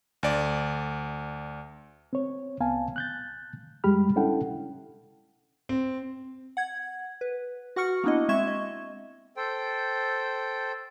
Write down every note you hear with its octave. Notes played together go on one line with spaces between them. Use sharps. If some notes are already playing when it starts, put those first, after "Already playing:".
D2 D5
C4 C#5
C2 B3 F5 G#5 A5
F#6 G6 A6
F#2 G3 G#3 G4 B5 F6
C#4 D4 E4 A4 F#5 G5
C4
F#5 G#6
B4
F#4 F#5 C#6 F6 C#7
A#3 B3 D4 E4 D#5
G#3 C4 E5 C#6 G#6 E7
D#5
A4 C5 G5